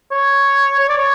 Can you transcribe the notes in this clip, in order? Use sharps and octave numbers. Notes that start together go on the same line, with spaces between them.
C#5
C#5
D5
C#5